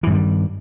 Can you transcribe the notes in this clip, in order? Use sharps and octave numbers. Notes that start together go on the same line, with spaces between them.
G2 D#3 E3 G3